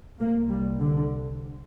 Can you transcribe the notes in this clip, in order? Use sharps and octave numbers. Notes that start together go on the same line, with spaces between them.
C2 C3 A#3
G3
D3